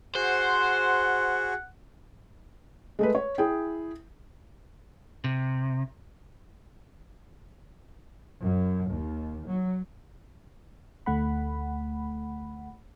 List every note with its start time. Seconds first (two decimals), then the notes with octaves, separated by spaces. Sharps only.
0.15 F#4 G#4 C5 F#5
2.99 G#3 A3 B4
3.15 C#5
3.38 E4 G#4 G5
5.24 C3
8.42 F#2
8.93 D#2
9.47 F#3
11.06 D2 A3 F#5 B5